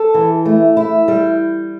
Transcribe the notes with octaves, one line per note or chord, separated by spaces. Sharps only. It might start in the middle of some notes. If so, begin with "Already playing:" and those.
Already playing: A4
E3
A3
E4
G3